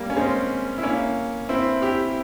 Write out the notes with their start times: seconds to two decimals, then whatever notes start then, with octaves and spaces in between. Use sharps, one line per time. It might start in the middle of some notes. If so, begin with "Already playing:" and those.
Already playing: G3 A#3
0.10 C#4
0.17 G#3 C4
0.78 E4
0.83 A#3 C#4
1.49 C4 E4
1.82 E4 G4